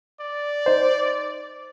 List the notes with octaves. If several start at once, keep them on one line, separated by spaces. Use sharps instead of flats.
D5
D#4 C5